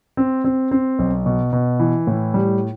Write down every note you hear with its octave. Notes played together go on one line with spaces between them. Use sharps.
C4
C4
C4
B1
B2
B2
E3
A2
G3